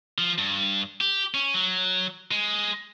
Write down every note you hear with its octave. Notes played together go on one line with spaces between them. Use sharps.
F3
G2
G4
C#4
F#3
G#3